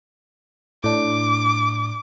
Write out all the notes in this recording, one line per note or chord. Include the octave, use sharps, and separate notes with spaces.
A2 D4 D6